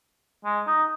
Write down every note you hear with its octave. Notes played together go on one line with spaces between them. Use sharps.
G#3
D#4